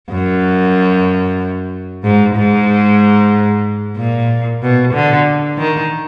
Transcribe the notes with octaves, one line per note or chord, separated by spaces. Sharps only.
F#2
G#2
G#2
A#2
B2
D3
D#3